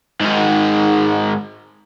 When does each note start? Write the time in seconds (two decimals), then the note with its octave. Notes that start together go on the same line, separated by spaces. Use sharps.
0.21 G#2 D#3